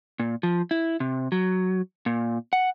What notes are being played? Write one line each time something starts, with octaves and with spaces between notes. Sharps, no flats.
A#2
F3
E4
C3
F#3
A#2
F#5